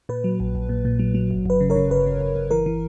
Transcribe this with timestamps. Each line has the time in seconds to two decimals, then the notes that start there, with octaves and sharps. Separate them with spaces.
0.09 A#2 B4
0.24 F#3
0.40 A#1
0.55 A#1
0.69 A#2
0.85 A#2
0.99 F#3
1.15 F#3
1.30 G1
1.45 G1 B4
1.61 C#3
1.70 A#4 C#5
1.76 C#3
1.90 G1 B4
2.06 C#3
2.21 G1
2.36 G1
2.51 E3 A#4
2.66 E3